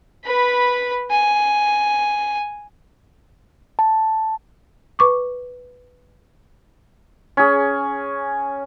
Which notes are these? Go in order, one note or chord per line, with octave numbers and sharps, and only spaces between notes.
B4 B5
G#5
A5
B4 C#6 D6
C#4 G#4